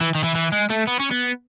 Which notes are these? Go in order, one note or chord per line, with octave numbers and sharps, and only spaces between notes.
E3
D#3
E3
E3
G#3
A3
B3
C#4
B3